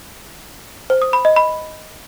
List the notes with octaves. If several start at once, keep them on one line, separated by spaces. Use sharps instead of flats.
C5
D#6
B5
D#5
B5